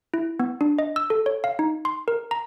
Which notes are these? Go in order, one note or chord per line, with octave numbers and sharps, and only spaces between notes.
E4
B3
D4
D#5
E6
A4
C#5
F5
D#4
C6
A#4
A#5